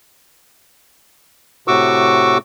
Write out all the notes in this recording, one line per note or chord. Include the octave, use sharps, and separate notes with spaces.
A2 C3 F#4 C#6 D6 E6